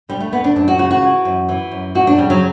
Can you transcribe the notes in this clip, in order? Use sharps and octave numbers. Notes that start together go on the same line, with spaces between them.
D3 G3
A3
D2 B3
D4
F#2 D4
F#4
C#3 F#4
F#4
E3
F#2
E3
F#2
F#2 F#4
D4
C#3 G3
F#3